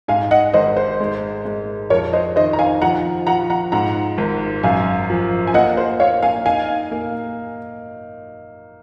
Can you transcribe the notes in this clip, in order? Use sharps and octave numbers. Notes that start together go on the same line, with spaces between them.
G#2 F5 G#5
D#5 F#5
G#1 C5 D#5
C5
G#3
G#3
F2 A#4 C#5
C5 D#5
D#3 C5 D#5
A#5
F5 G#5
F3 F#5 A#5
F3 F#5 A#5
F#5 A#5
G#2 F#5 A#5
G#1
F#2 F5 G#5
F3
G#5
A#3 D#5 F#5
C5
A#3 C#5 F5
F5 G#5
D#4 F5 G#5
A#3